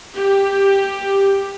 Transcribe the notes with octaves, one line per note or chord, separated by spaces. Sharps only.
G4